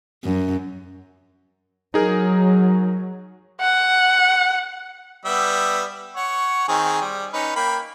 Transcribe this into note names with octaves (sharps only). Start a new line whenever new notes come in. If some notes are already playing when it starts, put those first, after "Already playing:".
F#2
F#3 D#4 G#4 A#4
F#5
G3 B3 E5
C#5 F#5 C#6
D#3 C4 G#4
G3
C#4 D#4 B4
A#3 G5 B5